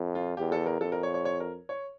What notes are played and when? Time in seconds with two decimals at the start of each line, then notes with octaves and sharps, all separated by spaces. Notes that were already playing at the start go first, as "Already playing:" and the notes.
Already playing: F2
0.15 F4
0.37 E2 G4
0.52 A4
0.66 A#4
0.81 F2 A4
0.92 A#4
1.03 C#5
1.14 C#5
1.25 C#5
1.40 A#4
1.69 C#5